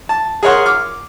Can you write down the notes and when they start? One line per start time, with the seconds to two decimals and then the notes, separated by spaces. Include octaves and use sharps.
0.09 A5
0.43 G#4 A#4 C#5 F#5 C6
0.66 D6 F6